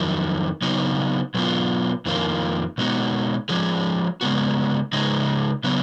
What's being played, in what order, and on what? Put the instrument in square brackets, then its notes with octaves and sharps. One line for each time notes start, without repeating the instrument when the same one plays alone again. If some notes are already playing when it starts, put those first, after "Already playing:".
Already playing: [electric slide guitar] F2 D#3 F#3
C#3 F#3 B3 D#4 F#4
B2 F#3 B3 F4
F2 D#3 A#3 F4
B2 G#3 B3 D#4 F#4
F3 G#3 C#4 G#4
C#3 G#3 B3 F#4
C#3 G#3 D#4 G#4
C#3 F#3 B3